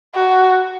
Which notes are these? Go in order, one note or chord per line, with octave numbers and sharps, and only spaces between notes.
F#4